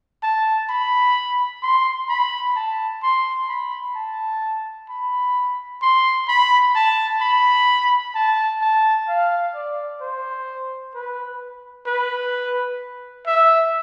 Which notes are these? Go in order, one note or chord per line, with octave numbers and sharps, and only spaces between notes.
A5
B5
C6
B5
A5
C6
B5
A5
B5
C6
B5
A5
B5
A5
A5
F5
D5
C5
B4
B4
E5